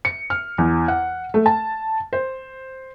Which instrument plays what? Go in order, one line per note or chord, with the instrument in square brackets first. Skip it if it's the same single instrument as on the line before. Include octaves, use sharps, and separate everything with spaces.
[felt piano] C#7
F6
E2
F#5
A3
A5
C5